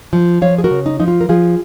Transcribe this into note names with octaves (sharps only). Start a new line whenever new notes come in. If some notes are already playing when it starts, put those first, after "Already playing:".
F3
F3 C#5 F5
G#4
F#4 A#4
C#3
D#4
F3 D#4
F4
A#4
F3 F4 G#4